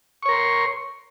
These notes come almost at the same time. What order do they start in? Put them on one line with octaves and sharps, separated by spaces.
C#6 C#5 A#4 C6